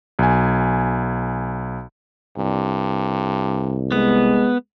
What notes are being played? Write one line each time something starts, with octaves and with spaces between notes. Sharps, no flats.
B1 G#5
C2 G2
G#3 B3